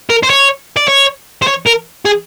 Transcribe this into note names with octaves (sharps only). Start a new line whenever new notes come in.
A#4
C5
C#5
D5
C#5
C5
C#5
A#4
G#4